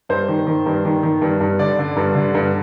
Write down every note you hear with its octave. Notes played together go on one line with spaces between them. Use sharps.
G2 C5
D#3
D#3
G2
D#3
D#3
G2
G2
D3 D5
D3
G2
D3
G2